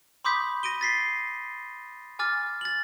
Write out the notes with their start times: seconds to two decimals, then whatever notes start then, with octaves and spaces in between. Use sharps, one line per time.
0.25 B5 C6 D6 D#6 G6 B6
0.63 A#6 D7 D#7 G7
0.81 A6 B6 C7
2.19 G#5 D6 F6 A6
2.61 A6 F#7